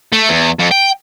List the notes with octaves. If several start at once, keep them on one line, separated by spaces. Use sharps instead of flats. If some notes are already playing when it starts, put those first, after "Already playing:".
A3
E2
F2
G5